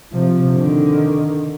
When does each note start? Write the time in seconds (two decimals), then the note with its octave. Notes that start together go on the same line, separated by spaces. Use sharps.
0.12 C3 F3
0.53 D3 D#3